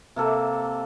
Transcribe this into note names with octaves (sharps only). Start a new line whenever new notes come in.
C3 A#3 A4